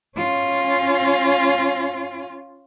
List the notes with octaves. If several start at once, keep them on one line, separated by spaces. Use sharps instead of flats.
C#4 F4